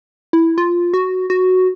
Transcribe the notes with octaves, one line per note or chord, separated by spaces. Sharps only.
E4
F4
F#4
F#4